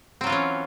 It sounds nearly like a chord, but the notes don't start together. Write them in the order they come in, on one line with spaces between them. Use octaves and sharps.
C4 F#3 F4 E3 C#4